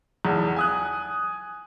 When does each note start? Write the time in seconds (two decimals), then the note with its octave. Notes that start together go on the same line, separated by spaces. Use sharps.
0.25 B1 E2
0.56 G#5 D#6 F#6